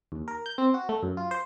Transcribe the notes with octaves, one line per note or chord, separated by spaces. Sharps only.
D#2
A#4
G6
C4
F#4
A3
F#2
F4
C5